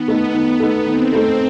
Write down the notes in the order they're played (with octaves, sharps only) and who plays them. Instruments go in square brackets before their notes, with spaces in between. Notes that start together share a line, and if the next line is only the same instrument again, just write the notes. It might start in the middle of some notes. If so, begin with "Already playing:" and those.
Already playing: [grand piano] D#3 [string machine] B3
[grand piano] A3 D#4 A4
D#3
A3 D#4 A4
[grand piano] D#3 [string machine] C4
[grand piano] A3 D#4 A4